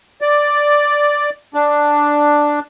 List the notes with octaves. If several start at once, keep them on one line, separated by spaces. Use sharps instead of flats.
D5
D4